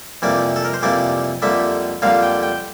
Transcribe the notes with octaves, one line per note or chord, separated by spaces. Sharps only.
F2 C3 E3 G3 A#3 D5
A4
A#4
C5
F2 C3 E3 G3 A#3 D5
F2 D3 G3 A#3 E5
F2 D3 G3 A#3 F5
G5
G5